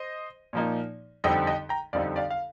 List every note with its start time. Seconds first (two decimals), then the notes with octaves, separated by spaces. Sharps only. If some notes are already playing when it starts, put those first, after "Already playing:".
Already playing: C5 D#5
0.53 A#2 F3 A#3 D#4
1.24 F2 D3 G3 C4 D#4 D#5 G5
1.47 D#5 G5
1.69 G5 A#5
1.93 F2 D3 G3 C4 D#4 D5 F5
2.16 D5 F5
2.30 F5